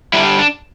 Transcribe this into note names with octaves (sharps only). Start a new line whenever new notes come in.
D3 G3 D4 E4
D4